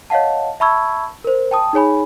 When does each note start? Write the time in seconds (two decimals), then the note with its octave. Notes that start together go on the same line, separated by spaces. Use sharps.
0.10 C#5 D#5 F5 F#5 A5
0.60 E5 A5 B5 C#6 E6 G#6
1.24 A#4 C5
1.51 G5 A5 D#6
1.73 D#4 G#4 C#5 G#5 B5